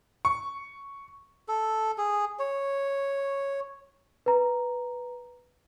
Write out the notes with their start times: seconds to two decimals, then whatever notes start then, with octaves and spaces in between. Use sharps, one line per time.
0.25 C#6
1.49 A4
1.98 G#4
2.39 C#5
4.26 B4 A#5